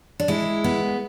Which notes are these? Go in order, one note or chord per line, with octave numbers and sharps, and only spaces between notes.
D4
G#3 E4
B3